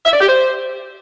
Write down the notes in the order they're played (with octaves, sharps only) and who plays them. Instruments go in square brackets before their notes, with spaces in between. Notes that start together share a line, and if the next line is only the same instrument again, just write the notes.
[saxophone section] E5
D5
G4
C5